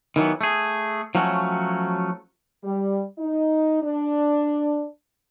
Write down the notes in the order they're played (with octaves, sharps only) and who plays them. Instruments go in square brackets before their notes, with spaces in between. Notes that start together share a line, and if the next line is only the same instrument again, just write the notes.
[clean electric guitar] D#3 E3 F#3 B3
A3 G#4
F3 F#3 A3 C#4 F#4
[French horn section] G3
D#4
D4